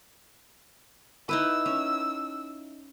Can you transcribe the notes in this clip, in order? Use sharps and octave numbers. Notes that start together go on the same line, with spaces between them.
D#4 E4 B4 E6
C#4